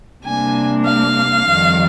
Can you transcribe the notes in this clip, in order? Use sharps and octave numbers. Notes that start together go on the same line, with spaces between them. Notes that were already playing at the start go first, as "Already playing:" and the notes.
C3 G3 A#3 D4 G#5
F5
F2 D#3 G3